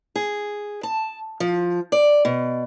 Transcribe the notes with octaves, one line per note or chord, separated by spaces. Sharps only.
G#4
A5
F3
D5
B2